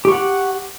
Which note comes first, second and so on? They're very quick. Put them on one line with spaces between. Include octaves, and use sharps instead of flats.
G4 C#6 F#5